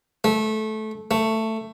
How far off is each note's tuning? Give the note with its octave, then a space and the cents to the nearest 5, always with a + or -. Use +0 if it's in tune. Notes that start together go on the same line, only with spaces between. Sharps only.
A3 -20
A3 +10